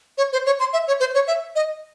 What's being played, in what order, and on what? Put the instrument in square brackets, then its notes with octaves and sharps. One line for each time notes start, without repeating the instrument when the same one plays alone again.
[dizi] C#5
C5
C#5
C6
E5
C#5
C5
C#5
E5
D#5